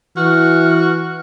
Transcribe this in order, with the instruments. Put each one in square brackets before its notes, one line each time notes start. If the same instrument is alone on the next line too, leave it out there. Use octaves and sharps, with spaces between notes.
[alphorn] E3 [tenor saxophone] F#4 [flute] F6